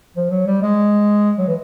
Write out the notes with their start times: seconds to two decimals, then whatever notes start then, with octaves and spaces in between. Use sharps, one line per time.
0.16 F3
0.31 F#3
0.47 G3
0.62 G#3
1.38 F#3
1.48 E3